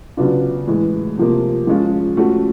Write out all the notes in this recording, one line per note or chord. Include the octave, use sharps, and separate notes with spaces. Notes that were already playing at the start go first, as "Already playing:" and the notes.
C#3 F#3 B3 D4 F4
A2 E3 G#3
C3 F3 A#3
F3 G#3 C#4 F4
F3 A3 C#4 F#4